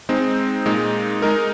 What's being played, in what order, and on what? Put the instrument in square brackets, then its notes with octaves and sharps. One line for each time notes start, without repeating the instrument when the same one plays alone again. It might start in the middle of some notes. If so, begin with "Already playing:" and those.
[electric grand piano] G#3 C4 D#4
A#2 G#3 D#4
G#3 D#4 A#4